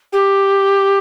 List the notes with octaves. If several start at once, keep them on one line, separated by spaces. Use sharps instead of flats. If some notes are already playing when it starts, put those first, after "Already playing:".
G4